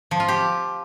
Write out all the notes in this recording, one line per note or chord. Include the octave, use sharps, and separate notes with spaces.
F3
F4
G4